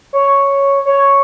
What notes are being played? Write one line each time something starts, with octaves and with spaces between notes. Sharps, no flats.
C#5
C#5